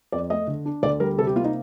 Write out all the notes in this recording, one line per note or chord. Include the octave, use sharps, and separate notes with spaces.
F2 D5
A3 D#5
D3
D4
D2 D5
G3 A#4
C3 A4
G4
A#3 F4
D#4